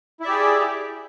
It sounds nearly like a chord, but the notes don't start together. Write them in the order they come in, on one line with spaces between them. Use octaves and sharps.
E4 E5 D5 G4 G#4